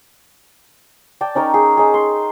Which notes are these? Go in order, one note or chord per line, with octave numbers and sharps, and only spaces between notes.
D5 G5 A5
C#4 D#4 A#4 C#5
G#4
D#4 G#4
C6